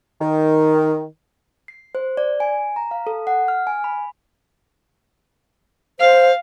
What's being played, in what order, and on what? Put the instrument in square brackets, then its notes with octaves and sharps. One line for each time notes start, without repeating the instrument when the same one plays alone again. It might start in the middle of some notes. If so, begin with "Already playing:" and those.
[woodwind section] D#3
[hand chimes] C7
C5
D5
G#5
A#5
F5
A4
F#5
F6
G#5
B5
[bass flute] C5 [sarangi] F5